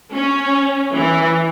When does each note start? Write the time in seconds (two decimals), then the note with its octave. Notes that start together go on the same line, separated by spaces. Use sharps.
0.14 C#4
0.95 E3